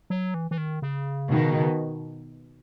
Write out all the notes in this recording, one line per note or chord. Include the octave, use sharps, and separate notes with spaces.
F#3
E3
E3
D#3
C#3
B2 D#3